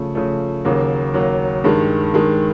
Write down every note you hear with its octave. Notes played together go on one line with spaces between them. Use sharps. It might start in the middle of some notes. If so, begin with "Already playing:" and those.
Already playing: C#3 F3 A3
C#3 F3 A3
D#2 C#3 F#3 A#3
D#2 C#3 F#3 A#3
G2 D#3 G#3
G2 D#3 G#3